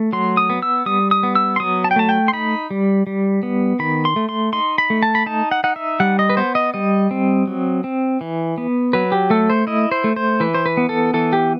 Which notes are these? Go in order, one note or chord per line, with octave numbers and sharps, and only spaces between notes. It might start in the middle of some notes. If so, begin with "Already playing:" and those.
Already playing: A3
F#3 C6
D#6
B3
E6
G3 D#6
D#6
B3
E6
C6
F#3 D#6
A5
G5
A3 A5
G5
C6
D#4 B5
G3
G3
B3
D#3 B5
C6
A3
C6
D#4 C6
B5
A3
A5
B5
D#4 A5
F#5
D#4 F#5
E5
G3 F#5
D#5
B4
B3 C5
D#5
G3 D#5
C4
F#3
C4
E3
B3
F#3 B4
G4
A3 A4
C5
E4 D#5
C5
A3
C5
E3 B4
C5
B4
B3
A4
E3 A4
G4